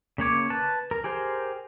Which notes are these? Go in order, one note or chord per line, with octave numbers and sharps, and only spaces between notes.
C#3 A#3 C#5 D6
B4 A5
A#4
G4 G#4 A#4 C5